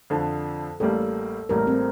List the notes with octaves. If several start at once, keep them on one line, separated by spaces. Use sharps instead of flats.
F2 D3 F3 A4
A1 A2 G3 A#3 A4
A1 A2 G3 A#3 A#4
C4